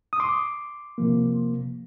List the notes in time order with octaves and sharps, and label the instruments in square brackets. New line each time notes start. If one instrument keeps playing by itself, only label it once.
[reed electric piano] D#6
C6 D6
C3 F3 A#3